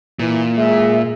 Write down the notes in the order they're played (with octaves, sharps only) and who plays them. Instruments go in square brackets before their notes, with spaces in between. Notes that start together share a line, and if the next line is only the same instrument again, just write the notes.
[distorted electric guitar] A#2 [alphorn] E3
[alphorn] G#3 [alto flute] E5